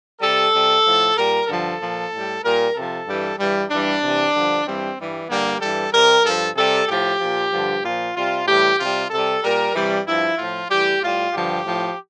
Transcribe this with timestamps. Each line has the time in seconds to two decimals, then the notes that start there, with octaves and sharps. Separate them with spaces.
0.21 C3 G3 A4
0.53 C3 G3
0.84 A2 F3
1.16 A#2 G3 A#4
1.47 G2 D3 F3 A4
1.79 A#2 F3
2.12 A2 G3
2.43 A#2 G3 A#4
2.75 C3 F3 A4
3.07 G2 E3 G3
3.38 G2 E3 G3
3.70 G2 E3 G3 D4
4.02 C3 E3 G3
4.34 G2 D3 F3
4.66 G2 E3 G3 C4
4.97 G2 E3 G3
5.29 G2 D3 G3 A#3
5.61 G2 E3 G3 A4
5.93 C3 G3 A#4
6.24 G2 F3 A4
6.56 C3 G3 A4
6.88 A2 F3 G4
7.19 A#2 F3
7.52 G2 D3 F3
7.83 A#2 F3 F4
8.15 C3 G3 F4
8.46 A2 E3 G3 G4
8.79 C3 G3 F4
9.10 C3 G3 A4
9.42 A#2 G3 A#4
9.74 C3 E3 G3
10.06 G2 F3 E4
10.38 A2 F3 F4
10.69 A2 E3 G3 G4
11.01 A2 G3 F4
11.33 G2 D3 F3 G4
11.65 A2 F3